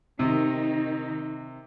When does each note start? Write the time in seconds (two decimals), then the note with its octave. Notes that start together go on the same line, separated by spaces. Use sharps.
0.19 C3 D#3 D#4